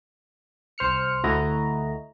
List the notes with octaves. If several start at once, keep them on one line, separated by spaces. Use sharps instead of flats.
C2 C5 F6 C#7
D2 A3 E4 F#4 D#5 A#5